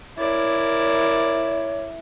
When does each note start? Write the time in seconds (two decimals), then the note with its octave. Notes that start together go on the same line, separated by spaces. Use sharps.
0.18 E4 A#4 C#5 D5